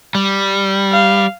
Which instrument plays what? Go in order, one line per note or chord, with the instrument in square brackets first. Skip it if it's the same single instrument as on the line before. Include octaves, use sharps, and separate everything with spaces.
[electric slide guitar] G3
[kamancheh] F5